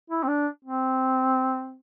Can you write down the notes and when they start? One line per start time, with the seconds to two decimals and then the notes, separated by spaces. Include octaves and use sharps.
0.10 E4
0.23 C4
0.28 D4
0.65 C4